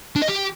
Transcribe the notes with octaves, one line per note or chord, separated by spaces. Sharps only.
D4
D#5
G4